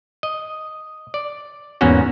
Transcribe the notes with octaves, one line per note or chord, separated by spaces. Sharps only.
D#5
D5
E2 G#2 A#3 B3 C#4 F#4